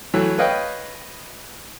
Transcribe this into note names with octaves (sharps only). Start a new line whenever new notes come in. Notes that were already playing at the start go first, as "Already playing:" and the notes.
E3 F#3 A3
B4 C#5 D#5 F5 G5